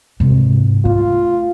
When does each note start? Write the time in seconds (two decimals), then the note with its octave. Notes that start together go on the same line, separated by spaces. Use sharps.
0.20 G#2 C3
0.85 A3 F4